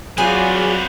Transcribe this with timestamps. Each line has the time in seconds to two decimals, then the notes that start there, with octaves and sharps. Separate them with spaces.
0.18 F#3 C4 F4 F#4 G#4 B4 D5